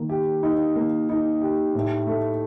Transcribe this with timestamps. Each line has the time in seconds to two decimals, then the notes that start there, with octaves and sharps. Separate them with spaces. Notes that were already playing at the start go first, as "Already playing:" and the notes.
Already playing: D#3 A#3
0.10 G4
0.43 D#4
0.76 A#3
1.09 D#4
1.42 G4
1.75 A2
2.07 A3